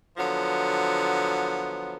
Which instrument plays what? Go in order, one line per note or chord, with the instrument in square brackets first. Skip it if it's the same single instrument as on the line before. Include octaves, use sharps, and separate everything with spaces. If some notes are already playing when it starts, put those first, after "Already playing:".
[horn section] D3 F3 F#3 B3